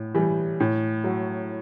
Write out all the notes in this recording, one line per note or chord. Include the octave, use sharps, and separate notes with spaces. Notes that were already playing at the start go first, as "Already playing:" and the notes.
Already playing: A2
E3 G3
A2
F#3